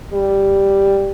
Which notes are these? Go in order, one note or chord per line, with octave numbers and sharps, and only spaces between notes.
G3